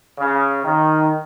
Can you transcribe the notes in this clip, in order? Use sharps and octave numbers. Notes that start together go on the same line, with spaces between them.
C#3
D#3